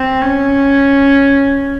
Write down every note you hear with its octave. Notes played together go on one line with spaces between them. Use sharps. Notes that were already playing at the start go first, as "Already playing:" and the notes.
Already playing: C4
C#4